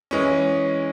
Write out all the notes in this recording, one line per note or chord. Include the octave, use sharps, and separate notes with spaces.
E3 G#3 C#4